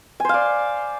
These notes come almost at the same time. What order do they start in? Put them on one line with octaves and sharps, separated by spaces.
G#5 C5 F5 D5